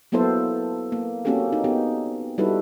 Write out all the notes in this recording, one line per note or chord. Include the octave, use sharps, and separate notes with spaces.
F#3 A#3 B3 E4 A4 C5
A#3
A#3 C4 C#4 F#4 G4 A4
D#4
B3 D#4 G4
G3 D#4 E4 F#4 A4 B4